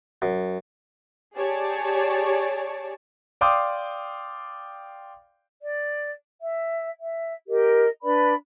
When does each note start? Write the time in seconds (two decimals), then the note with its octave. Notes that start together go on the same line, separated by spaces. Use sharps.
0.22 F#2
1.37 G4 G#4 C#5 D5 A5
3.41 D5 F5 G5 C6 D6 D#6
5.62 D5
6.41 E5
7.00 E5
7.48 G4 A#4 D#5
8.02 D4 B4 D5 B5